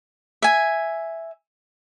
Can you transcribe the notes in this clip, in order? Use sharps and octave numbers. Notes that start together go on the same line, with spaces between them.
E5 G#5